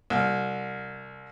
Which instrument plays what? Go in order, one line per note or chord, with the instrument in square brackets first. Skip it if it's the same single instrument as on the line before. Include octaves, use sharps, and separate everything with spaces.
[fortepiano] C2 F6